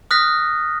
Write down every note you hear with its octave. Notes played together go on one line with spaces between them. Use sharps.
D#6 F6 F#6 A#6 B6